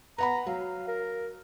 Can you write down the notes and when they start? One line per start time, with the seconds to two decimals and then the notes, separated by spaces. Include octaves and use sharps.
0.18 B4 F#5 A#5 B5
0.46 F#3 F5
0.88 A#4